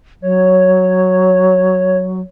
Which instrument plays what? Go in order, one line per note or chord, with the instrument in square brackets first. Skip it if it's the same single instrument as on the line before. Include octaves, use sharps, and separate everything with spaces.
[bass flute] F#3 [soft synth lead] C#5